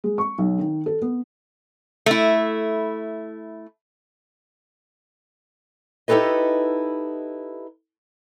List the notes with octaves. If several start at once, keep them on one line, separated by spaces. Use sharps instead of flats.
G#3
C#6
B1
D#3
A4
B3
A3 E4
D#4 E4 G4 A4 B4 D#5